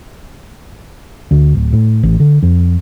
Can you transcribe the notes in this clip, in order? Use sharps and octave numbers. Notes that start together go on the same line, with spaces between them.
D2
D1
A2
A1
D3
F2